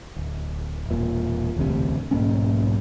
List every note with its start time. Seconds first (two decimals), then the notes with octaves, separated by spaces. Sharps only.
0.16 D1
0.89 E1 A#2
1.56 E1 A1 D2 C3
2.11 B1 G#2 A#3 C#4